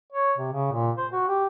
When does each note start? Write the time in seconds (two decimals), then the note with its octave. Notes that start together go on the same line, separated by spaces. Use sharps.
0.12 C#5
0.38 C3
0.52 C#3
0.72 A#2
0.97 C5
1.12 F#4
1.28 G4